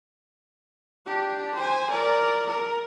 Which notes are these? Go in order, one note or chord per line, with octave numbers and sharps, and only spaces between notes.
D4 G4
C5 G#5
A#4 D5
A#4